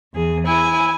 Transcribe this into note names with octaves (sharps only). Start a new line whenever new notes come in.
E2 G#4
E4 G#5